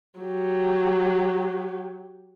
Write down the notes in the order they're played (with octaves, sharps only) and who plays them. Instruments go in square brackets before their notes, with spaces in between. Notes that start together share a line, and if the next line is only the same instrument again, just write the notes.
[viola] F#3 G4